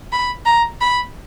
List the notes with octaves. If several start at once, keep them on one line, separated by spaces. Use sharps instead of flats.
B5
A#5
B5